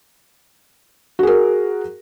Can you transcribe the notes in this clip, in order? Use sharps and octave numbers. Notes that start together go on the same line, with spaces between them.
F#4 G#4 A#4